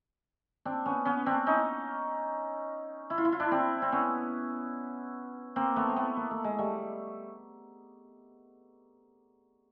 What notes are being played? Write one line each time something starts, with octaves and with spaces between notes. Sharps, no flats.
C4 D4
B3 C#4
B3 C#4
C4 D4
C#4 D#4
E4
F4
E4
F4
D4 E4
C4 D4
C4
B3 C#4
A#3 C4
A3 B3
C4
A3 B3
A#3
A3
G#3
G3 A3